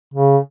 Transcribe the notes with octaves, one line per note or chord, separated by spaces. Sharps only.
C#3